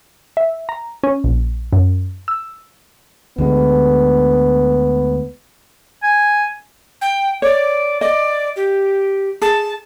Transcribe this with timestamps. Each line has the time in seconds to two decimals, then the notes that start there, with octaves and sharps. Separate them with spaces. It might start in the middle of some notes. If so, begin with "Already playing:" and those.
0.37 E5
0.69 A#5
1.03 C#4
1.24 A#1
1.73 F#2
2.28 E6
3.38 D2 D3 G#3 B3
6.03 G#5
7.01 G5
7.42 C#5 D5
8.01 D5 D#5
8.56 G4
9.41 G#4 A5